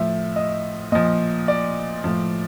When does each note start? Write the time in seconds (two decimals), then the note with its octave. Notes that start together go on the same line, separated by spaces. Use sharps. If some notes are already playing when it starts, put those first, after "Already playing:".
Already playing: A2 F3 E5
0.36 D#5
0.92 A#2 F3 D#5
1.48 D5
2.04 A2 F3